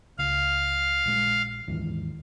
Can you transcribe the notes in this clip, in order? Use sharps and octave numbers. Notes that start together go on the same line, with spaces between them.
C#2 F5
A#1 G#3
D#2 G#2 E3